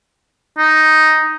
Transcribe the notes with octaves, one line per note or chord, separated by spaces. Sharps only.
D#4